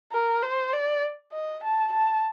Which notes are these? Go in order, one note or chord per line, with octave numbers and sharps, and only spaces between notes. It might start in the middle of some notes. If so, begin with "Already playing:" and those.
A#4
C5
D5
D#5
A5
A5